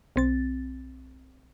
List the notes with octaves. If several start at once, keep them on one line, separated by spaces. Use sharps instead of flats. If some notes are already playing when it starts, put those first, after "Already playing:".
B1 C4 A6